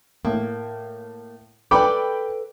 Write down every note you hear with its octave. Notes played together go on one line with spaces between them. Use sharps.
A2 A#3
A4 B4 D5 G5 B5 D6